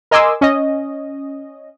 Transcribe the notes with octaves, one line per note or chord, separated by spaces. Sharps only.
A#4 D#5 G#5 C6 D6 E6
C#4 D#5